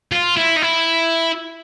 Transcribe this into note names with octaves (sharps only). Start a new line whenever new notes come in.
F4
E4
D#4
E4